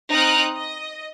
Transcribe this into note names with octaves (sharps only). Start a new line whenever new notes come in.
C4 D#4 D#6 F6 F#6 D7
D#5